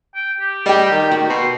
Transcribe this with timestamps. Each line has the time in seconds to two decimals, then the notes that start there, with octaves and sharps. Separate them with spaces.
0.15 G5
0.40 G4
0.66 G3 D#5 G5
0.91 D#3
1.11 F#4
1.30 B2 C6